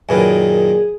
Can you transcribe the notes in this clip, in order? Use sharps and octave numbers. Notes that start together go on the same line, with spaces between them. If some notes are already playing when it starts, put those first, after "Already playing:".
F#2 A#2 D#3 G#4 B4 G#5